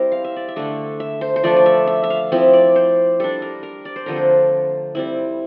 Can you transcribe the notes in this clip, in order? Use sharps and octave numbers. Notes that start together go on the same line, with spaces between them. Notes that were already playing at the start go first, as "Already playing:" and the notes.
Already playing: G3 C4 E4 A#4 C5
F5
E5
D5
E5
D3 A3 D4
E5
C5
C5
F3 A3 D4 D5
D5
E5
E5
E5
F5
F3 C4 E4 E5
D5
C5
G3 D4 A4
A#4
A#4
D5
C5
D3 F3 A3 C4 A#4
C5
G3 C4 E4